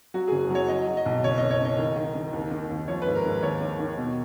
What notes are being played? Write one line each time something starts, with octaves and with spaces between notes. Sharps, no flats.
F#3 F#4
F#1 G#4
F#3 C#5
F#3 D#5
F#3
D#5
B1
F#1 C#5
D#5
F#1
C#5
F#2 D#5
D#3
D#3
D#3
D#2
D#3
D#2
F3 C#5
B4
G#2
A#4
G#2
D#2 C#5
D#3
D#3
B2